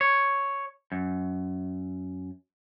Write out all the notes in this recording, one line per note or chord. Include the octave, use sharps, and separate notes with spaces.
C#5
F#2